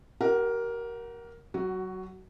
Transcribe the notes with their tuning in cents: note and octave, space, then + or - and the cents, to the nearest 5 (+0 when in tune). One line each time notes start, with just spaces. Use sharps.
G4 -35 A#4 +10 F#5 +0
F#3 +30 F#4 +5